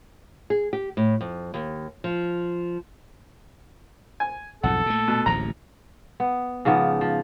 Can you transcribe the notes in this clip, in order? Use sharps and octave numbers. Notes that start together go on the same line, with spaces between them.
G#4
G4
A2
F2
D#2
F3
G#5
B1 F2 G#2 A4 F#5
A#2 A3
B2
D1 A1 D#2 A#5
B3
G#2 C#3 F3 B3
F3